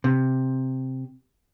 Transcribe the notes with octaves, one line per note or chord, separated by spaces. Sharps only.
C3